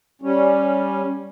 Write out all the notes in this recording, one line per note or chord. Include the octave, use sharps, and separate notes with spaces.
G3 C#4